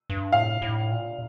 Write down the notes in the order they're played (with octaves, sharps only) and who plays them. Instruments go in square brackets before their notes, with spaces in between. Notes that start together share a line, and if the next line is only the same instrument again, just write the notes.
[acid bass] G2
[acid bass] A2 [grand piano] F5
[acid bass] A2
A#2